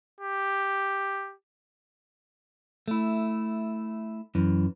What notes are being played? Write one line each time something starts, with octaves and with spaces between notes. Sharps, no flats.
G4
A3 E4
F#2 E3